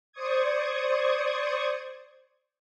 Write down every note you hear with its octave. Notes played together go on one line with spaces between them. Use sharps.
C5 D5 C#6 D#6 G#6